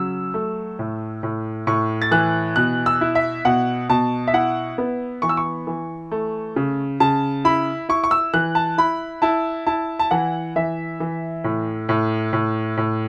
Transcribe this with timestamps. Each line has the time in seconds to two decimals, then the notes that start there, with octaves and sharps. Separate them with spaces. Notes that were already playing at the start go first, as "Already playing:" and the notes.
Already playing: C#3 F#3 E6
0.34 A3
0.79 A2
1.23 A2
1.67 A2 C#6
2.02 A6
2.11 E3 F#6
2.56 B2 F#6
2.86 E6
3.01 E4
3.15 E5
3.45 B2 F#5
3.89 B2 A5
4.27 E5
4.33 E4 F#5
4.78 B3
5.22 E3 C#6
5.29 E6
5.37 C#6
5.67 E3
6.11 A3
6.56 C#3
7.00 C#3 A5
7.45 E4 B5
7.89 E4 C#6
8.04 C#6
8.11 E6
8.34 E3 F#6
8.55 A5
8.78 E4 B5
9.22 E4 A5
9.67 E4 A5
9.99 A5
10.11 E3 F#5
10.56 E3 E5
11.00 E3
11.44 A2
11.89 A2
12.33 A2
12.77 A2